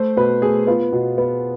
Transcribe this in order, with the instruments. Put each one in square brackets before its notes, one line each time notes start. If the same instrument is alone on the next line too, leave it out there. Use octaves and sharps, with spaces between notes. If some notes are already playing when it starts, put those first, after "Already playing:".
Already playing: [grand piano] A3 C5
B2 B4
A3 G#4
B3 F4
B2
B3